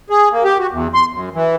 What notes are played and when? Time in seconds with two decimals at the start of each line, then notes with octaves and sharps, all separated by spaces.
0.10 G#4
0.32 A#3
0.44 G4
0.59 F#4
0.71 E2
0.94 C6
1.13 F#2
1.34 E3